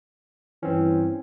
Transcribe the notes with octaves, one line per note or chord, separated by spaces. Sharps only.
G2 E3 C4 C#4